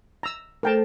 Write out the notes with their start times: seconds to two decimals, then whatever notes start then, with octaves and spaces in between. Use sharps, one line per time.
0.23 A#5 E6
0.63 A3 A4 A#4 C5 G5 A5